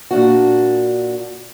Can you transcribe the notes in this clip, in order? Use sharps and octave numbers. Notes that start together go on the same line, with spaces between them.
A#2 D4 F#4